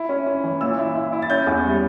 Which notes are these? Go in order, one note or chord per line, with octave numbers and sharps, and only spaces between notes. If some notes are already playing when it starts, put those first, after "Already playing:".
Already playing: E4
C#4
C#4
E3
A#2 E6
E4
E4
E4
A6
C#4 G6
E2
G3